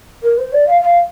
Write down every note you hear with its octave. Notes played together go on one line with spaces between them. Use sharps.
A#4
C5
D5
F5
F5